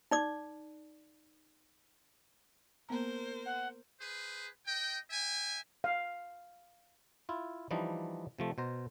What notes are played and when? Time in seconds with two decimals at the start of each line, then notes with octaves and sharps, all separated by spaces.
0.11 D#4 D5 D6
2.89 A#3 B3 A#4 C5 A#5
3.45 F#5
4.01 G#4 B4 C5
4.66 D#5 G5
5.10 E5 G5 G#5
5.84 F5
7.29 E4 F4
7.71 E3 F3 G3 D4 D#4
8.39 C3 F3 A3
8.58 B2 C5 A#5